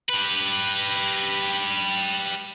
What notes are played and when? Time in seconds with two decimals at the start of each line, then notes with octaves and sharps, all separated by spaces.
0.09 G4 B4